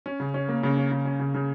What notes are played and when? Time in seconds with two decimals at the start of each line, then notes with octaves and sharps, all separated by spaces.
0.06 C#4
0.20 C#3
0.34 C#4
0.49 A#3
0.63 C#3
0.77 C#4
0.92 C#3
1.05 C#4
1.20 C#3
1.34 C#3